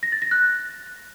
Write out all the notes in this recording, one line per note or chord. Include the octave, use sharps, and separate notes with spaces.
A#6
A6
A#6
F#6